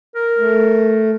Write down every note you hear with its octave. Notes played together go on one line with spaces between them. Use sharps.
A#4
A3